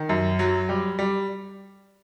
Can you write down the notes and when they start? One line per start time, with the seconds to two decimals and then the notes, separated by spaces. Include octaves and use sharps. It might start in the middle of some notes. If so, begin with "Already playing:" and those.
Already playing: D#3
0.09 F#2
0.39 F#3
0.69 G3
0.99 G3